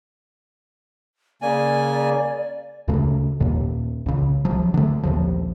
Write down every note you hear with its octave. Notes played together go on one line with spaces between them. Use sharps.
C#3 A#3 D5 G#5
D2 C#3 A3
D#2 A#2
C#2 C#3
C2 F3 F#3
D3 A3
A#1 D#2 F3